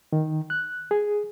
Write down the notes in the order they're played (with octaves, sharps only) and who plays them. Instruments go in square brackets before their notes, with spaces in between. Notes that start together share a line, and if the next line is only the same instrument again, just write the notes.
[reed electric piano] D#3
F#6
G#4